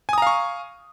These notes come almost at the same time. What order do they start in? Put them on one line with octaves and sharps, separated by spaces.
G#5 D#6 A#5 F5 C#6